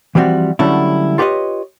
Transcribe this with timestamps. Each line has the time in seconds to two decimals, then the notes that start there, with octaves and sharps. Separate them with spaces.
0.15 E3 F3 G3 C4 F#4
0.59 D3 F#3 G3 A3 C#4 E4
1.18 F4 G4 B4 C#5 D#5